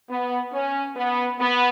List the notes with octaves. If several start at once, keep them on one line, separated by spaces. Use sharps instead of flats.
B3
C#4
B3
B3